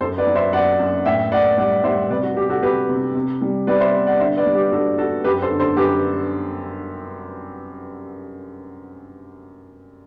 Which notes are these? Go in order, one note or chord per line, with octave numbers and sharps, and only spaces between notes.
F#2 A4 C5
B4 D5
F#3
C5 E5
F#2 D5 F#5
F#2
A2 E5 G5
A2 D5 F#5
G3 D5 F#5
G3 C5 E5
C3 B4 D5
F#4
C3 G4
F#4 A4
C3 G4 B4
C3
C3
G3
G3 B4 D5
C5 E5
B3
D5 F#5
D3 C5 E5
B4 D5
G3
G4
G2 F#4 A4
B3 F#4 A4
F#2 G4 B4
A4 C5
D3
A4 C5
F#2 G4 B4